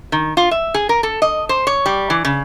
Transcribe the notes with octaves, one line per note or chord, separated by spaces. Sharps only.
D#3
F4
E5
G#4
A#4
A4
D#5
C5
C#5
G3
E3
C#3